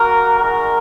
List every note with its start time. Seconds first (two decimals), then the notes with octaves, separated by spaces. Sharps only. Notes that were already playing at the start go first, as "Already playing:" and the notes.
Already playing: A#3 F#4 A#4
0.39 G#3 D#4 F#4 A#4